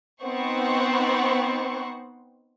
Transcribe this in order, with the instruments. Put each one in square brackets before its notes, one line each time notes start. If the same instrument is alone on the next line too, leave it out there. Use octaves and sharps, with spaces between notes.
[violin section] B3 C4 D#4 C5 F#5 C#6